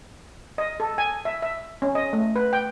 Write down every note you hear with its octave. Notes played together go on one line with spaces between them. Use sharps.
D#5
A4
G#5
E5
E5
C#4
D#5
A3
B4
G5